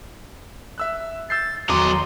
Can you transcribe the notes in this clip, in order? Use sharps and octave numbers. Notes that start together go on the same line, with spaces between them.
E5 E6 F#6
E6 G6 A6 C7
E2 D#3 F#3 D#5 A#5 C6 D6